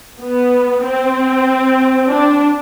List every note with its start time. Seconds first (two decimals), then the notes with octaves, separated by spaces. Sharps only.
0.21 B3
0.84 C4
2.09 D4